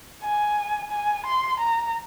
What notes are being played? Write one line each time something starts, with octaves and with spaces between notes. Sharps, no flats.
G#5
G#5
C6
A#5